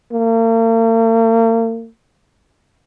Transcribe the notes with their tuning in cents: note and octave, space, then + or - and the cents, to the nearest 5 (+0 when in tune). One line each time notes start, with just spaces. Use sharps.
A#3 -45